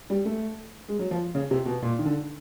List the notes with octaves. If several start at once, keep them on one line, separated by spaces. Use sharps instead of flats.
G3
A3
G#3
F#3
F3
C#3
C3
B2
A#2
D#3
D3